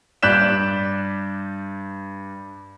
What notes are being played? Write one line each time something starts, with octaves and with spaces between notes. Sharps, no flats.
G2 D5 F#6 G6 B6 E7